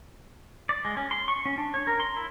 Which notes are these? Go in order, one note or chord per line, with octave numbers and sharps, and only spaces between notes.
D5
G#3
C#4
C6
C#6
C#4
D4
C#5
A#4
C6
E4